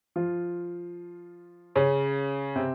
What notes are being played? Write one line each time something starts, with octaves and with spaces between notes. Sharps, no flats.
F3 F4
C#3 C#4
C3 C4